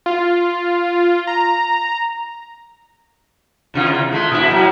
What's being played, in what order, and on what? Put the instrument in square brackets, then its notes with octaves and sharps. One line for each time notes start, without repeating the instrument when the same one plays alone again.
[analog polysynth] F4
A#5
[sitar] E2 C3 F4
G#3 A3
A#2 E4
A2 F#3